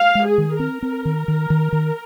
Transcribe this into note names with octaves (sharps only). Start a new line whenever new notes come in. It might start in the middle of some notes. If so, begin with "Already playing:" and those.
Already playing: F5
G#3
G#4
D#3
C4 A#4
C4
D#3
D#3
D#3
D#3